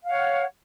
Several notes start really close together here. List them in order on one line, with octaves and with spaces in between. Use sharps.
F5 F#5 C#5